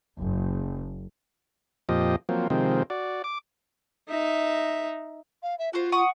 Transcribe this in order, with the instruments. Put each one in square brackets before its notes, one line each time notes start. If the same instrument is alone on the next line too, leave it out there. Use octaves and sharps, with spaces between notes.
[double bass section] F#1
[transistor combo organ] F2 A#2 F3 G4 D#5
F3 F#3 A#3 C4
C3 D#3 F3 G#3 C4
F#4 D5
D6
[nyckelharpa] D#4 E5
[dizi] F5
E5
[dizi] F4 [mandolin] F#4 C5
[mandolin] F#5 C#6 D#6